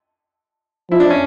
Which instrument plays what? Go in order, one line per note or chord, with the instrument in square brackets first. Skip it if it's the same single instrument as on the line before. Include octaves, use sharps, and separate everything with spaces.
[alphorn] F3 [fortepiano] E4
[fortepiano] D4
C#4